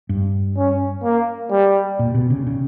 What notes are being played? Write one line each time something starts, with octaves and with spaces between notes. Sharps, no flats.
G2
C#4
A#3
G3
A#2
B2
C#3
C#3